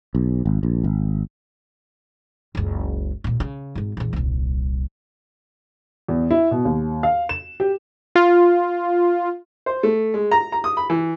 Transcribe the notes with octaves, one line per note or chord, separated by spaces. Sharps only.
B1
G#1
A#1
G#1
F#1 C#2
D#2 A#2
C#3
G#1 G#2
A#1 E2
D#1 C2
E2
E4
B2
D#2
F5
E7
G4
F4
C5
A3
G#3
A#5
A#5
D#6
B5
E3